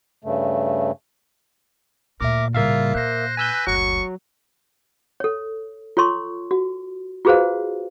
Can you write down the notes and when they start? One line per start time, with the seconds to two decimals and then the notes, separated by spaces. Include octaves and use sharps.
0.24 G2 C#3 A3
2.21 D2 A#2 A#4 E5 D6
2.55 A2 C#3 G3 A#3 F4 E5 F5
2.95 A#2 C5 F#6 A#6
3.37 B4 G#5 E6 G6
3.67 F#1 D2 F#3 C#6
5.20 A4 C#5
5.97 F4 A4 C#5 C6 C#6
6.51 F#4
7.25 F4 F#4 G#4 B4 C5 F5